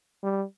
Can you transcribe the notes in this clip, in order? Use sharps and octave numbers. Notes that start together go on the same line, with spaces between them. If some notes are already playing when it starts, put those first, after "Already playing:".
G3